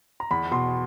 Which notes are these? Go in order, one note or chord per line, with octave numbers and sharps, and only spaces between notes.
A#5
E2 B5
B2 C6